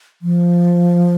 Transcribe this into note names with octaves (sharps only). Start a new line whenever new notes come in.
F3